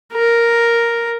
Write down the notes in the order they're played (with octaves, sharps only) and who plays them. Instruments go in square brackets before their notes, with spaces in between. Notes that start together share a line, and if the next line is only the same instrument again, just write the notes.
[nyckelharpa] A#4